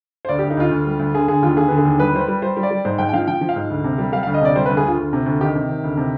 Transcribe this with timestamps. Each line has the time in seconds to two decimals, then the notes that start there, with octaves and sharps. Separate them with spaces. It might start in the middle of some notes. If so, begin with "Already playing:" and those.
0.25 C5
0.29 D2 D5
0.39 D2 G4
0.50 D#4
0.57 D2 F4
0.71 D2
0.86 G3
0.99 D2
1.14 D3 G#4
1.28 D3 G#4
1.42 D#2 F4
1.56 D3 G#4
1.68 D3 B4
1.78 G#4
1.85 D#2
1.99 G3 B4
2.14 G3 C5
2.21 B4
2.28 G3
2.42 G3 C5
2.56 G3
2.63 D5
2.71 G3
2.85 G#2 C5
2.98 G#2 G5
3.09 G5
3.13 F3 F5
3.27 F3 G5
3.41 F3
3.49 F5
3.56 G#2
3.70 D2
3.84 C3
3.98 G3
4.12 G3 F5
4.23 D2 F5
4.34 D#5
4.41 C3 D5
4.55 G3 C5
4.66 D2 B4
4.77 G#4
4.84 D2 F4
4.98 D2
5.13 C3
5.26 D2
5.41 D#3 G4
5.55 C3
5.69 D#3
5.84 D2
5.97 C3